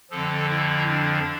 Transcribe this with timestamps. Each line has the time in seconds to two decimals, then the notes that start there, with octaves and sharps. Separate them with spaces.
0.10 F2 D3 F3 A4
0.49 E4
0.88 D4